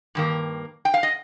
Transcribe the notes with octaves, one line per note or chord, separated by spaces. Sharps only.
G2 D#3 A#3
G5
F5
D#5